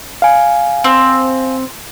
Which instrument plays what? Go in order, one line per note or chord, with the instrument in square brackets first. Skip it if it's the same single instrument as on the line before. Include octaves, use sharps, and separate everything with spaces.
[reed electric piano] F5 G#5
[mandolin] C4